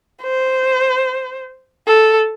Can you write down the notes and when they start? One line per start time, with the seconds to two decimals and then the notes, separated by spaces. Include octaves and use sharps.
0.23 C5
1.87 A4